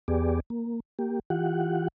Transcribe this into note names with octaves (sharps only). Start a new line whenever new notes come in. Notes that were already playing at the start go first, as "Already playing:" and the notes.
E2 B3 G4 G#4 D5
A#3
A#3 G4
E3 F4 G4 F#5